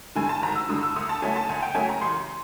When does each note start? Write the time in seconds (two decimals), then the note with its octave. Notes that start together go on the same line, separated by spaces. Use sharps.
0.15 G2 D3 G#5
0.29 A5
0.42 G#1 A#5
0.56 E6
0.69 G2 D3 D#6
0.83 E6
0.96 D2 D#6
1.09 A5
1.22 C#3 F#3 A3 G#5
1.36 A5
1.49 D2 G#5
1.62 G5
1.75 C#3 F#3 A3 G#5
1.89 A#5
2.01 A1 C6